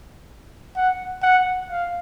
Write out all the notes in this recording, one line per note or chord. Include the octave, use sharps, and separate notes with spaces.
F#5
F#5
F5